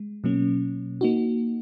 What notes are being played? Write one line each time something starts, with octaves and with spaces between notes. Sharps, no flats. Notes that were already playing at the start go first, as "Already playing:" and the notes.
Already playing: G#3
B2 F#3 A#3 C#4
A#3 D#4 F#4